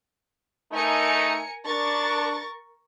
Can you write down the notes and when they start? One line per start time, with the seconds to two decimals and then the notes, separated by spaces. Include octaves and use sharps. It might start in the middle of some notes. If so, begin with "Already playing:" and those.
0.72 A3 D#4 A#4 G#5 C#7
1.65 D4 A#4 C#6 A6